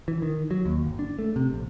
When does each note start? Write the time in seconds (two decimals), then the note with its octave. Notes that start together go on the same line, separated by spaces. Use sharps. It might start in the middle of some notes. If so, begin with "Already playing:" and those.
0.08 E3
0.22 D#3
0.51 F#3
0.65 D#2
0.85 G1
0.99 D4
1.19 A3
1.36 C3
1.53 A#1